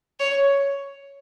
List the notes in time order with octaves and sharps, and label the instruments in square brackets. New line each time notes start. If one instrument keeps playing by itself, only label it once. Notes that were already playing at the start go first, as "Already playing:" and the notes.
[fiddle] C#5